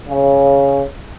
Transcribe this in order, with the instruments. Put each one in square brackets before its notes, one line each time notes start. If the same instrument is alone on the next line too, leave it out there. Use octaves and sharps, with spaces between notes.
[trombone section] C#3